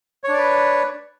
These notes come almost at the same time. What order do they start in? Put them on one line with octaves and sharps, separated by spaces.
C#5 D4 D5 B4